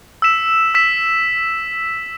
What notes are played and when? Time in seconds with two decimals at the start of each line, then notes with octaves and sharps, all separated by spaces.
0.22 E6 B6 E7
0.75 E6 B6 E7